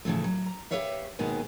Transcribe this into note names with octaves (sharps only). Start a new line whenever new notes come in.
A2 C#3 E3 F3 A3
F#3
A#5
G4 A4 B4 C#5 E5 F5
D#2 B2 D#3 G#3 B3 G#5